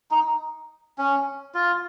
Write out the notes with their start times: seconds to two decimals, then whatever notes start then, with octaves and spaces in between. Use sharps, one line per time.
0.11 D#4
0.98 C#4
1.54 F4